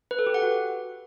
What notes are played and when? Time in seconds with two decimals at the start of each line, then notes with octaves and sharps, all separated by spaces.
0.11 B4
0.19 A4
0.27 G4
0.34 F#5
0.42 F#4